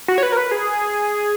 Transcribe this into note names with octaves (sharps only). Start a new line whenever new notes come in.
F#4
C#5
B4
A#4
B4
G#4